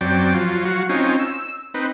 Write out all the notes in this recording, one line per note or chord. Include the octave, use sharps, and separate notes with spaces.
F#2 F#3 C4 D5 G5
F3 F#3 F4
F#3 F#4 F5
C4 C#4 D#4 F4
E6
C4 D#4 B4